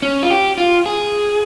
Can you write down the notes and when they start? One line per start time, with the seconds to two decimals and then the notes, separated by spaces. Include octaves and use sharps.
0.02 C#4
0.23 F4
0.31 G4
0.58 F4
0.86 G#4